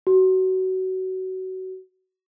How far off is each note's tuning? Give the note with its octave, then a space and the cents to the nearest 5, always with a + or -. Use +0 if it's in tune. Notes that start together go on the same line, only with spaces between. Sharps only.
F#4 +25